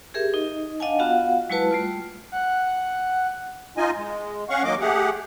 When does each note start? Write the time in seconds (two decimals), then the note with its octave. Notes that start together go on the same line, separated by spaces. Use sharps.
0.14 G4 G#4 A#4 E5
0.34 D#4 D#5
0.80 D4 D#5 F5 F#5 G#5 A5
0.99 B3 F4 F#4 F5 F#5
1.50 F#3 G#3 E4 F#4 B4 A5
1.71 G3 A3 F4
2.32 F#5
3.78 D#4 F4 D#5 G#5
3.97 G#3
4.49 C#4 F5 F#5 C#6
4.64 D#3 F#3 A#3 D#5 D6
4.80 A3 G4 G#4 F#5